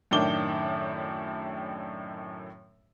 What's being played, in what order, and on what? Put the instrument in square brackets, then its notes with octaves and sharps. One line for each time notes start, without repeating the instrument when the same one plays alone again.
[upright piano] F#2 A2 D#3 D4 D6 G7